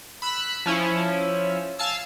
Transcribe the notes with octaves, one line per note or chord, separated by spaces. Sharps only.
B5 E6 F#6
F3 C#4 E4
F5 G#5 A5 E6